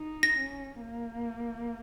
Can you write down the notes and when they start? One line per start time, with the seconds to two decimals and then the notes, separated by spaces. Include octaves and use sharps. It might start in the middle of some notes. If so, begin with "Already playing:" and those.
Already playing: D#4
0.23 A#6
0.38 C#4
0.81 A#3